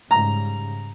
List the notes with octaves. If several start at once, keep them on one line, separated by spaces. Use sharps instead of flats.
G#2 C#3 G3 A#5